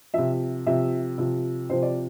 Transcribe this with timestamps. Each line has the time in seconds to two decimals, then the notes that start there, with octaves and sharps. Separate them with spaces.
0.14 C3 F3 E5
0.66 C3 F3 E5
1.18 C3 F3
1.69 C3 F3 C5
1.83 D5